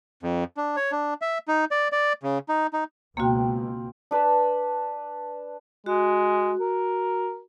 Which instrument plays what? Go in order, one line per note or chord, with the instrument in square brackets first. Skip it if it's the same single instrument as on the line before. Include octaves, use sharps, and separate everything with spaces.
[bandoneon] F2
D4
C#5
D4
E5
D#4
D5
D5
C#3
D#4
D#4
[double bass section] C#2 B2 [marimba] A#3 F#4 [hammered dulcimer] C4 F5 G5
[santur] D4 B4 A5 B5
[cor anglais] G#3 [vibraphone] F#4
[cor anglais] A#4